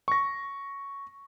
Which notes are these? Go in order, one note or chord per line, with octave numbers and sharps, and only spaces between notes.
C#6 A#6